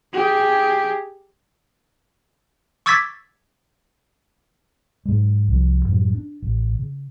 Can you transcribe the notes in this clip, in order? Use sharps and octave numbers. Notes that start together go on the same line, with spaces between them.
G4 G#4
C#6 D6 E6 G#6 A6 B6
G#2 F#3 G#3
C2 F3
F#2 A2 F#3
D4
A1
C#3